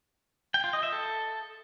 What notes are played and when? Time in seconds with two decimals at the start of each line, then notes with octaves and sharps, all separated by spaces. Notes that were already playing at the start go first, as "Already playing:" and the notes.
0.54 G5
0.64 F4
0.73 D#5
0.83 E5
0.92 A4